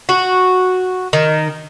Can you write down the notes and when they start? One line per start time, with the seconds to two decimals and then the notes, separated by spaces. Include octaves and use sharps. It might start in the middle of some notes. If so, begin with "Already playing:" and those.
0.09 F#4
1.13 D#3